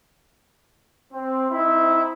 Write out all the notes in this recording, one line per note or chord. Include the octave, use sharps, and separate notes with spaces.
C4
C4 D#4 E4